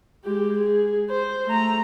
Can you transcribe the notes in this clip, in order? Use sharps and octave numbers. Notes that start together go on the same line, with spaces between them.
G#3 G4
G#4
C5
A3 A#5